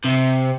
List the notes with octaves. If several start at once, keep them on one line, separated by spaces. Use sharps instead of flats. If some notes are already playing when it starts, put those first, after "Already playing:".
C3